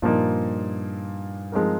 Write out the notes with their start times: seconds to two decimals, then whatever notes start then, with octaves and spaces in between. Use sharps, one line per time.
0.02 G2 A#2 F3 A#3 D#4
1.52 F3 G#3 C4 D#4 A#4